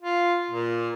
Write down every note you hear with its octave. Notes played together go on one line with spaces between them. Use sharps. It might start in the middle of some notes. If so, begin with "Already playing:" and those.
F4
A#2